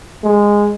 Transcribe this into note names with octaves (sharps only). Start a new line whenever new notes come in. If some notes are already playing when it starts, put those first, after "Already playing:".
G#3